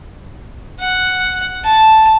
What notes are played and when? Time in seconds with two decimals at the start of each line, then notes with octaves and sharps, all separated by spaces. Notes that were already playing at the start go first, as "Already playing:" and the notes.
0.80 F#5
1.64 A5